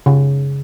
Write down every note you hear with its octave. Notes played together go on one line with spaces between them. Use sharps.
C#3